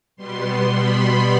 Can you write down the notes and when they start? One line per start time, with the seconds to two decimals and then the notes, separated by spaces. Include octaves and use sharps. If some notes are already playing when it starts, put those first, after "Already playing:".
0.16 B2 G3 B3 C6
0.70 B5